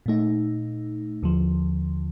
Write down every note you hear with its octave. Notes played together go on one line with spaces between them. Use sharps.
A#2 A3 D#4
D#2 D3 F3